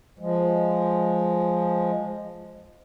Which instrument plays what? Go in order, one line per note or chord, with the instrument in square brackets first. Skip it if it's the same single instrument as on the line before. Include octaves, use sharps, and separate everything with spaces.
[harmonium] F3 G#3